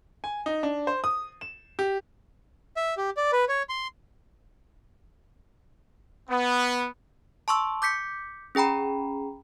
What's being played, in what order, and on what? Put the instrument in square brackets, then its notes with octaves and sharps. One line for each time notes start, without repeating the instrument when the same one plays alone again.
[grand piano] G#5
D#4
D4
C5
D#6
E7
G4
[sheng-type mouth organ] E5
G4
D5
B4
C#5
C6
[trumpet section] B3
[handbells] A5 C6 C#6 E6
D6 G6 B6 C#7
C#4 G#4 G5 A#5 B5